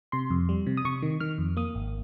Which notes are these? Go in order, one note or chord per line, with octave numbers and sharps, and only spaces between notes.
C3 C6
F2
G3
C3
D#6
C3 C#6
D#3
D#3 F6
F2
A#3 D#6
G#1